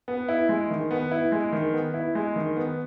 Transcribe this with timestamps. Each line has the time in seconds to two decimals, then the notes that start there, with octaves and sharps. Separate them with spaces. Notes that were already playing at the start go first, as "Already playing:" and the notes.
0.08 B3
0.28 E4
0.49 G#3
0.70 D#3
0.91 B3
1.11 E4
1.32 G#3
1.53 D#3
1.73 B3
1.94 E4
2.15 G#3
2.36 D#3
2.57 B3